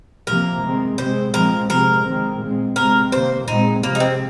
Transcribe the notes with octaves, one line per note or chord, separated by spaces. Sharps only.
C3 F3 A#3 A#4
D#3 G#3 C4
C3 G#3 C4 C5
A#2 F3 G#3 C4 A#4
C3 G#3 C4 A#4
D#3 G#3 C4
A#2 G#3 C4
C3 G#3 C4 A#4
C3 D#3 A#3 C5
A#2 G#3 C4 D#4
C3 F3 G#3 A#3
D#4
C4